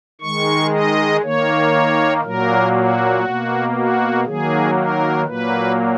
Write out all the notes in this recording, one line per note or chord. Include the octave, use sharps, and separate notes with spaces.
D#3 G#3 C#6
D#5
D#3 A#3 C#5
A#2 F#3 A#3 A#4
F#4
B2 A#3
F#4
D#3 F#3 A#3 G#4
A#4
A#2 F#3 A#3 B4